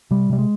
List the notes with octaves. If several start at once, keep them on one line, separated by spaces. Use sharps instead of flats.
C3 G3
C3 G3
G#3